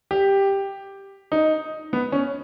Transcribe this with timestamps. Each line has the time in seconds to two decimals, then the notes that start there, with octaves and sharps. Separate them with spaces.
0.11 G4
1.32 D#4
1.93 B3
2.12 C#4